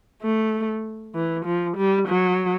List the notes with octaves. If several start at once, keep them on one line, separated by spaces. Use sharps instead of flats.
A3
E3
F3
G3
F#3